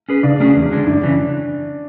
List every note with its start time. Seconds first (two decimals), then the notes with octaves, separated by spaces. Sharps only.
0.09 C#4 G#4 B4
0.23 C#3 D4 D5
0.40 F#3 A3 C#4 G#4
0.56 E2
0.72 D3 G#3 D4
0.86 F#2 D4 D5
1.03 C#3 E3